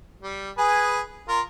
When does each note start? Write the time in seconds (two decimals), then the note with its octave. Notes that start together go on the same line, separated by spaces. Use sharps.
0.22 G3
0.58 G#4 B4 G#5
1.28 F4 A#4